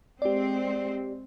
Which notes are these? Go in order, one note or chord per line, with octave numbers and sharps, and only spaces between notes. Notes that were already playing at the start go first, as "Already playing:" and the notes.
G#3 C4 G4 D5